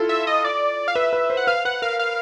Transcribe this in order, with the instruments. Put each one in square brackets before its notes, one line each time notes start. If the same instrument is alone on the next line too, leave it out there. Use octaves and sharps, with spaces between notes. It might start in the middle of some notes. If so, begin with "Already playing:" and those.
Already playing: [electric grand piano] E4 F4 A4
[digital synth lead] E5
D#5
D5
F5
[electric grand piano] B4 [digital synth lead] E5
[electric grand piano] B4
C5
[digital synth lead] F#5
[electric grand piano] B4 [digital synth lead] F5
[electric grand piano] B4 [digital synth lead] F#5
[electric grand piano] A#4 [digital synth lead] F5
[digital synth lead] F5